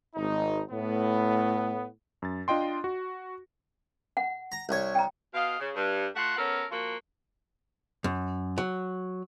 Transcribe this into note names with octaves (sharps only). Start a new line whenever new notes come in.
G#1 D#4
A2 B3
F#2 A6
D4 F4 D#5 G5 C6
F#4
F#5
A#5
C2 C#5
G5 A#5
B2 D#5 F5
C#3
G2
A3 F4 F#4 F#5
B3 C#4 A4 A#4
F3 A#3 F4 F#4
F#2
F#3